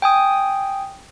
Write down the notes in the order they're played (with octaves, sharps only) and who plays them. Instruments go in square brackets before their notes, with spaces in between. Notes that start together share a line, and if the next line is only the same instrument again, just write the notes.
[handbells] G5 G#5 D#6